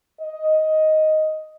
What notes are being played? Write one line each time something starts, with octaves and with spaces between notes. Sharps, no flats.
D#5